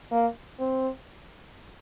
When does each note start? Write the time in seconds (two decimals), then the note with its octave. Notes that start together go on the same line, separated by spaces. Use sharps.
0.11 A#3
0.59 C4